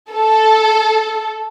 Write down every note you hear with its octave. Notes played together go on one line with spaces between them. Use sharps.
A4